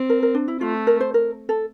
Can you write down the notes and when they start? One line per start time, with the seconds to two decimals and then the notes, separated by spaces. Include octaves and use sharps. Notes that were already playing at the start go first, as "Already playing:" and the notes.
Already playing: C4
0.09 A#4
0.23 A#4
0.35 D4
0.48 E4
0.61 A3 F4
0.87 A#4
1.00 C5
1.14 A#4
1.49 A4